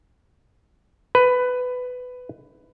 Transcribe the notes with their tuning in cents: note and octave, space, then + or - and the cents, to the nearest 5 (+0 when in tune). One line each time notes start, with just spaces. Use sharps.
B4 +15